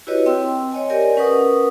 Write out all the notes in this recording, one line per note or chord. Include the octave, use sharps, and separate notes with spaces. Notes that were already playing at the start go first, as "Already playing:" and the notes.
E4 F#4 G4 B4 C#5 D#5
C4 G5 C6 E6
C#5 D#5 G#5
G4 A#4 D5 D#5 G#5
C#4 A#4 B4 F#5 C#6 D#6